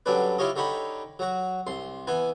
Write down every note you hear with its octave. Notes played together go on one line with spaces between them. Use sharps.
D3 F#3 G3 C#4 D4 B4
E4 F4 G4 C#5 D#5
D3 D#4 G4 C#5 B5
F#3 F#4
C2 C6
E3 B3 B4 G#5